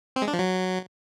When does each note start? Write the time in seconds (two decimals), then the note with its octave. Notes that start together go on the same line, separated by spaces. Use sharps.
0.16 C4
0.22 G#3
0.28 D4
0.33 F3
0.39 F#3